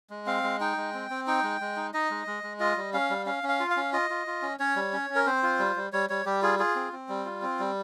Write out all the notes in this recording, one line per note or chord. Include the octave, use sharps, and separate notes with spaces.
G#3
C4 F5
G#3
D#4 G5
G#3
C4
C4
D#4 G5
G#3
G#3
D#4
D#4 D#5
G#3
G#3
G#3
F4 D#5
G3
C#4 F5
G3
C#4 F5
C#4
F5
F4
F5
C#4
F4 D#5
F4
F4
C#4
C#4 C#5
G3
C#4
C#4
A#4
C4 C5
F4
G3
G3
G3 C#5
G3 C#5
G3 G4
F4 G#4
F4 G#4
C4
C4
G3
F4
C4
G3